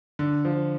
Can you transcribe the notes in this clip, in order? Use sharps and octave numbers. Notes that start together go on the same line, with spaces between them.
D3
F3